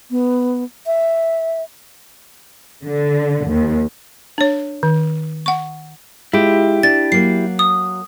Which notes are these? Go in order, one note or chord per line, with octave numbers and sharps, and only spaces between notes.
B3
E5
D3
D#2
D4 C#5
D#3
F#5 C#6
G#3 E4 F4 G4
D4 A6
F#3 A#3 C7
D#6